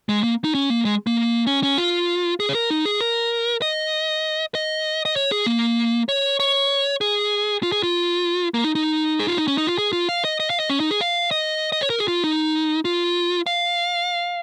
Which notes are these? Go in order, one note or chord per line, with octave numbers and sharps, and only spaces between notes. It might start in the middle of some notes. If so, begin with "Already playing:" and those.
G#3
A#3
D#4
C#4
A#3
G#3
A#3
C#4
C#4
F4
G#4
C#5
A#4
D#4
G#4
A#4
D#5
D#5
D#5
C#5
G#4
A#3
C#5
C#5
G#4
F4
G#4
F4
A#3
D#4
D#4
G#4
F4
D#4
C#4
D#4
F4
G#4
F4
F5
D#5
D#5
F5
D#5
C#4
D#4
G#4
F5
D#5
D#5
C#5
A#4
G#4
F4
D#4
F4
F5